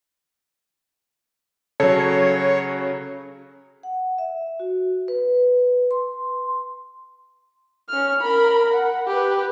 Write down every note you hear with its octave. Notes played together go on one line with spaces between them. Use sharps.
C#3 F#3 A4 C#5
F#5
E5
F#4
B4
C6
C#4 F6
A#4 B5
F#5
G4 B4